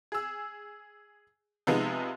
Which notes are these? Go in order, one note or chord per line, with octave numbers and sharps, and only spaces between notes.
G#4 E6
C3 F3 G#3 B3 D#4